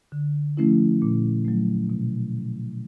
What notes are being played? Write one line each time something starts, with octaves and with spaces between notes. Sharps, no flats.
D3
F3 A3 C#4 E4
A#2
F#3 A3
B2